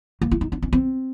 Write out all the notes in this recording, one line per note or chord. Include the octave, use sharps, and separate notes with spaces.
A#3
E4
D#4
D4
C#4
C4